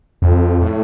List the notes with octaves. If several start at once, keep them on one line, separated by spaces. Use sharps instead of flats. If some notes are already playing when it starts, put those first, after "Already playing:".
F2
A2